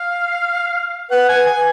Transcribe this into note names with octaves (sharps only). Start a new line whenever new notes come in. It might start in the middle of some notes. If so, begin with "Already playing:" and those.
Already playing: F5
B4 F#5
G#5
G#5